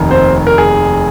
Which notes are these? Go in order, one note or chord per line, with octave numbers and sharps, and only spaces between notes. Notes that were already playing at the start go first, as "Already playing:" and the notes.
Already playing: F1 D#2 D#3
C4 C5
A#4
G#4